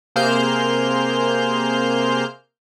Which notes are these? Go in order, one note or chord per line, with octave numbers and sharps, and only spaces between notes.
C3 A#3 G#4 C5 F6 G6